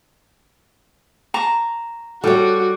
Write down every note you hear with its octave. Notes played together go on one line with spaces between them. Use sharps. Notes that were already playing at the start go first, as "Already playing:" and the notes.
A5 A#5 C#6
G3 F#4 A4 C#5